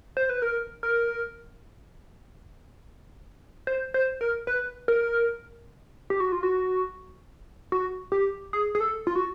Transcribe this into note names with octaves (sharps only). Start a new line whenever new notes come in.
C5
B4
A#4
A#4
C5
C5
A#4
B4
A#4
G4
F#4
F4
F#4
F#4
G4
G#4
G#4
A4
F4
F#4